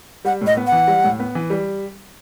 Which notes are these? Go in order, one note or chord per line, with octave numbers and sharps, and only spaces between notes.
G3 F#5
A2
D#5
B3
F#5
E3
G3
A2
B3
E3
G3